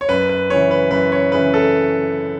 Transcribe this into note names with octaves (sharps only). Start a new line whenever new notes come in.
C#5
F#2 B4
B4
C#3 E3 C#5
B4
F#2 B4
C#5
C#3 E3 B4
A4